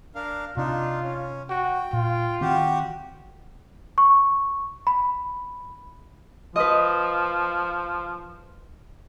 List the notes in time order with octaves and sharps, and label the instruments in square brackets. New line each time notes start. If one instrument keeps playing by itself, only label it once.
[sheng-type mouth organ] D4 A#4 F5
[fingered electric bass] C3 [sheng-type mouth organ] D4 D#4 [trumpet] F4
[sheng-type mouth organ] C#4
[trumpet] F#4 [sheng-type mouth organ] G5
[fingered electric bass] A#2 [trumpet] F4
[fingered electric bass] D#3 C4 [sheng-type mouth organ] F#4 G4
[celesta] C#6
B5
[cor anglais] F3 [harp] B4 D#5